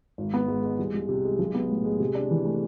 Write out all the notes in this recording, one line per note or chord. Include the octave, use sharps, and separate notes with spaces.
G#1
B3
G#2
G#3
C2
C2
C3
G#3
B1
B3
A2
G#3
C3
D4
E3
A3